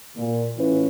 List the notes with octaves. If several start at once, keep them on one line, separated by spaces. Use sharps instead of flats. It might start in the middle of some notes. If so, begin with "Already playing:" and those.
A#2
A2 E3 C#4 E4 F4 B4